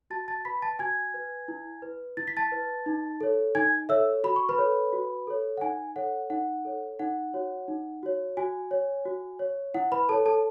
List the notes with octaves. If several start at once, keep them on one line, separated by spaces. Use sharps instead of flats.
F#4 A5 A6
A5 A6
B4 B5 B6
A5 A6
F#4 G#5 G#6
B4
E4
B4
E4 A6
B6
A5 A6
B4
D#4
A4 C#5
D#4 G#5 G#6
A4 C#5 E5 E6
F#4 B5
C#6
B4 B5
A4 C#5
F#4
A4 C#5
F#5
D#4 G#5
A4 C#5 F#5
D#4 F#5
A4 C#5
D#4 F#5
F#4 C#5
D#4
F#4 C#5
F#4 G#5
C#5
F#4
C#5
E4 F#5
B4 B5
A4 C#5 A5
A4 A5